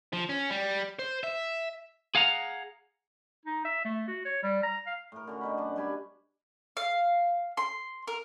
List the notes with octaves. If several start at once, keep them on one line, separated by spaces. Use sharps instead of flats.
F3
C#4
G3
C5
E5
G#4 F5 F#5 A#5
D#4
E5
A3
F#4
C#5
G3
A#5
F5
A2 A#4
D3 C#4 F#4
B2 D#4 B5
F#2 D4
G3 G4 G#5 B5
F5
C6
A#4